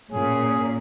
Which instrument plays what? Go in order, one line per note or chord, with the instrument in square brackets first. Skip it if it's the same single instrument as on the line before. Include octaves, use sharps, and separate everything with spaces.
[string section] A#2 [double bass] C#4 [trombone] G#4